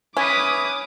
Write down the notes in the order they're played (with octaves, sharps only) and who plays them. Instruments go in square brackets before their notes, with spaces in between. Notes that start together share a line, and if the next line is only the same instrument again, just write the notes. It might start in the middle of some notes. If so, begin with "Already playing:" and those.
[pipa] C#4 [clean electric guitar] E4 B4 [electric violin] D6 D#6